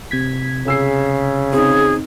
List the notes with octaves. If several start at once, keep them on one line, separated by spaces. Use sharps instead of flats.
C3 G#6 B6
C#3 G#4 E6 C7
C4 D#4 G#4